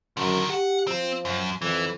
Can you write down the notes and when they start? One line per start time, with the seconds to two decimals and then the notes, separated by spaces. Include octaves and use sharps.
0.17 F#2 D3 D#3
0.50 G4 F#5
0.87 F3 C4
1.25 F#2
1.62 F2 E3